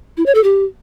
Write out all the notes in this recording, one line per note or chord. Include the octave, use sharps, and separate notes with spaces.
E4
C#5
A4
G4